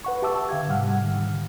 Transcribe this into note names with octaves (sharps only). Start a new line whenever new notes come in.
B4 F#5 C#6
G4 E5 A5 D6 E6
D3 F5 G5 G#6
G#2 C3 G3 F#5 F6
G#2 D3 D#3 G3